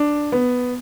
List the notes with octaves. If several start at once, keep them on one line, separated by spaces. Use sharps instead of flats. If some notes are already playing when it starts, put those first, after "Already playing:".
Already playing: D4
B3